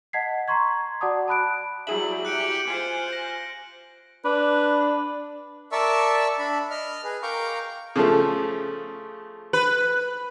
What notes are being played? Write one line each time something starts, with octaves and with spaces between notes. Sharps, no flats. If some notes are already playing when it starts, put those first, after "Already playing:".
D#5 F#5 A5 G#6 B6 C7
A#5 C6 C#6 G#6
F#4 D5 F#5 A5 D6 D#6
A5 B5 F#6 D7
F#3 G3 E4 G#4 E5 F#7
G4 F#6 C#7 D7
F4 C5 G#5
A#6
D4 B4
A#4 D5 E5 A5 C#6 E6
D4 B5
D#5 F6
G#4 B4
A#4 F5 G5 A#5 C#6 D6
C#3 F3 A3
B4